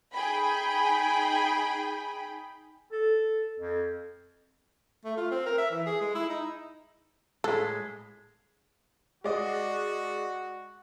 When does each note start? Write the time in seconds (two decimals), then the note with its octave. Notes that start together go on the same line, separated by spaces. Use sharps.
0.14 D#4 G#4 G5 B5
2.92 A4
3.60 F2
5.05 A3
5.17 F4
5.31 C4
5.46 A#4
5.58 E5
5.71 E3
5.86 G#4
6.01 G#3
6.15 E4
6.29 D#4
7.44 A2 G#3 G#4 A4
9.24 G#3 F#4 D5 D#5